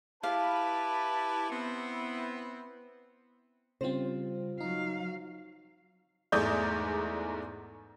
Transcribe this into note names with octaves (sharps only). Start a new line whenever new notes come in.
E4 G4 B4 F5 A5
B3 C4 E4
C#3 G3 C4 F4 C5
F#3 D#4 F5
E2 G#2 A3 D5 D#6 G6